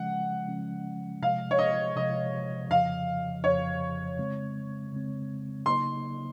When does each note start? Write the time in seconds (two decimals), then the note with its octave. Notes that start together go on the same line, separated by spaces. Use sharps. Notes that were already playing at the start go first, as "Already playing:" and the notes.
Already playing: C#3 F3 G#3 C#4 F#5
0.48 C#3 F3 G#3 C#4
1.22 C3 F3 G#3 F5
1.51 C#5
1.59 D#5
1.96 C3 F3 G#3 D#5
2.70 F2 C#3 F3 F5
3.44 F2 C#3 F3 C#5
4.18 C#3 G#3 C4
4.92 C#3 G#3 C4
5.66 C#3 F#3 A#3 D#4 C6